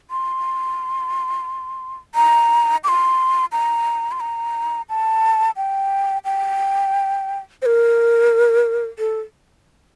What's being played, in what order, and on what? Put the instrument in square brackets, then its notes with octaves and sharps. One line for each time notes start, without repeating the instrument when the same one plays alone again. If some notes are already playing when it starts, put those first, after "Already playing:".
[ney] C6
A#5
D6
C6
A#5
C6
A#5
A5
G5
G5
C5
A#4
A4